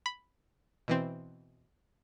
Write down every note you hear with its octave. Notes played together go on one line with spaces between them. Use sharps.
B5
B2 E3 C4